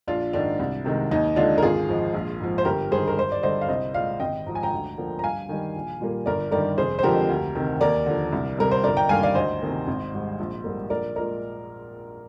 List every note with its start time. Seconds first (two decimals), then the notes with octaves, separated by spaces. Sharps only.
0.07 A#1 D4 F4
0.33 G#2 D#3 G#3 D4
0.59 C2
0.85 C3 D#3 G#3
1.11 D#2 D#4
1.36 D3 G#3 D4 F4
1.58 A#4
1.62 G#1 F4 G#4
1.88 G#2 F3 G#3
2.14 A#1
2.40 G#2 F3
2.58 C5
2.65 G1 G4 A#4
2.91 G2 D#3 G#4 C5
3.08 A#4
3.17 G2 C5
3.32 D5
3.43 D3 G3 C5 D#5
3.61 F5
3.68 C2 C5 D#5
3.94 A#2 G#3 D5 F5
4.20 G#1 D#5 G5
4.46 G#2 F3 G#3 A#5
4.55 G#5
4.63 G5 A#5
4.72 D2
4.98 D3 F3 A#3
5.19 A#5
5.23 G2 F5 G#5
5.49 D#3 G3
5.75 A#1
6.01 A#2 G3 A#3
6.26 G1 A#4 D5
6.52 G2 D#3 G3 A#4 D5
6.78 F1 G#4 C5
6.99 C5
7.03 F2 D3 F3 G#3 G4 A#4
7.29 D2
7.55 C3 D#3
7.81 D#2 A#4 D5
8.06 D3 F3
8.32 C2
8.58 C3 G3 A#4
8.71 C5
8.84 G1 A#4 D5
8.96 G5 A#5
9.09 G2 D#3 A#3 F5 G#5
9.23 D5 F5
9.35 D2 C5 D#5
9.62 C3 D#3 A#3
9.87 G#1
10.13 G#2 G3
10.39 A#1
10.64 G#2 G3 A#3
10.90 A#1 A#4 D5
11.16 A#2 G#3 A#4 D5